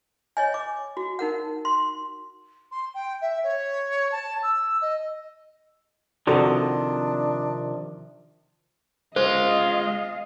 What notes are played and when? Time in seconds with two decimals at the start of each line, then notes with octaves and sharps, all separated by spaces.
0.37 C#5 D#5 G#5
0.54 D6
0.97 F#4
1.19 D#4 A#4 F#5
1.65 C6
2.71 C6
2.94 G5
3.21 E5
3.43 C#5
4.11 A5
4.42 E6
4.81 D#5
6.27 C3 D#3 F3 D4 F#4 A4
9.16 G#3 F4 C5 D#5 F5